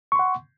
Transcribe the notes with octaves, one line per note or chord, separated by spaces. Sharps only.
F#5 C6 C#6